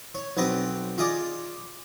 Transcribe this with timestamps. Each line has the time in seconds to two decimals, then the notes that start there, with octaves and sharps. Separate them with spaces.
0.15 C#5
0.37 B1 C4 B4 D#5 G5
0.98 F4 G#4 D5 D#5 D6